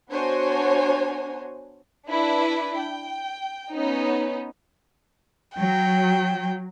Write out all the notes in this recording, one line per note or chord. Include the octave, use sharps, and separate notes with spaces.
B3 D4 F#4 C5 C#5 G#5
D4 E4 B4
G5
B3 C#4 D#4
F#3 G5